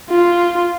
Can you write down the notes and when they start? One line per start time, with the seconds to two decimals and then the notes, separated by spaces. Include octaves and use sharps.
0.10 F4